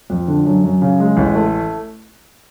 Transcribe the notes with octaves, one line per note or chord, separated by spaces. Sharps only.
F2
D3
F#2
F#2
C#3
G#3
A1
A3